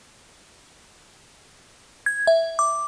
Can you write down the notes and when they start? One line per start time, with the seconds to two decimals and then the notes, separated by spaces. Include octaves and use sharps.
2.06 G#6
2.27 E5
2.59 D6